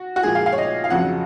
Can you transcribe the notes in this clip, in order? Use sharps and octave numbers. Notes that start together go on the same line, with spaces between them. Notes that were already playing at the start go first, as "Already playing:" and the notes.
Already playing: F#4
F#4
A#2 F3 G#3 G#4
F5
F5
C#5
D#5
F5
F2 C#3 F#3 F#5